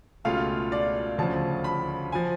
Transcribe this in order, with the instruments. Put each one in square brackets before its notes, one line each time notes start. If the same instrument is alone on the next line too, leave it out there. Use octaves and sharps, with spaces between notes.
[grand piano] C#2 B2 A3 F4 G#4 [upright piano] F5
[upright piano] D5
[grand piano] D2 C#3 F3 [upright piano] A5
[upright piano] B5
[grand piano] F3 [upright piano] G#5